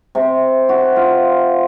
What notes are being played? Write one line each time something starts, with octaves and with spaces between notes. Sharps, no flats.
C3
F#4
F4